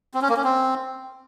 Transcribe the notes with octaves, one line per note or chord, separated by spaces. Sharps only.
C4
C#4
A#3
C#4
C4